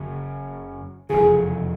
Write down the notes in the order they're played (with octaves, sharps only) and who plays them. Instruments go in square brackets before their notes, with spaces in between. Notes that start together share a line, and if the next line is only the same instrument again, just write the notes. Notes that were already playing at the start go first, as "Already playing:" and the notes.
Already playing: [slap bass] F#1 F#2 C#3
[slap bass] F1 E2 C#3 [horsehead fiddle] G#4